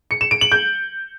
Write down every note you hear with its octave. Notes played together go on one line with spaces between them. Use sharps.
C#7
E7
D7
F#7
G6